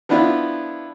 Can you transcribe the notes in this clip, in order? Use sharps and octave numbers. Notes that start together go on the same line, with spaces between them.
F3 B3 D4 E4 F4